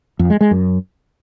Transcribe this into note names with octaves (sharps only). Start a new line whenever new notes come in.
F2
G#3
G#3
F#2